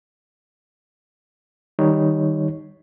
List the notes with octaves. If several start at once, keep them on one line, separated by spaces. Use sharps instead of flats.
D#3 G3 D#4 C#5